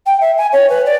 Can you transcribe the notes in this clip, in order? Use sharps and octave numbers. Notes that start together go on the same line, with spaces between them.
G5
E5
G#5
C#5
B4
D5